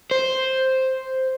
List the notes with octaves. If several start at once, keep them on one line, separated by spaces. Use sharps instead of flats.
C5